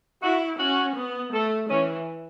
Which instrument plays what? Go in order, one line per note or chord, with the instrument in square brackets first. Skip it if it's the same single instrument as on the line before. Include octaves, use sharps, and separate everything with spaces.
[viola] E4 [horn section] F#4
[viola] C#4 [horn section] F#4
[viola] B3
[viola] A3 [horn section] A4
[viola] E3 [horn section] C#4